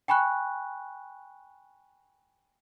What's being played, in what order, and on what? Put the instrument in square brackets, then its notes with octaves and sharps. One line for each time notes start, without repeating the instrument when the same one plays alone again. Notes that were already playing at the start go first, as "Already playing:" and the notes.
[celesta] G5 G#5 B5 C#6 F#6